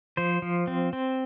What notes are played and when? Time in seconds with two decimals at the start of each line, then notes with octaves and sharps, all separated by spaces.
0.17 F3 C5
0.42 F3
0.67 C4
0.93 C4